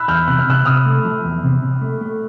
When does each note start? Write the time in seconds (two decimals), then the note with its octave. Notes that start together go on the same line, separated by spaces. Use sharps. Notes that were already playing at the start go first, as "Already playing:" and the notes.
Already playing: B5 E6 F#6
0.08 E2 F6 G6
0.28 C3 F#6
0.39 F6
0.47 C3 E6 F#6
0.65 C3 D#6 F6
0.86 A3
1.05 F3
1.24 E2
1.43 C3
1.62 C3
1.82 A3
2.01 A3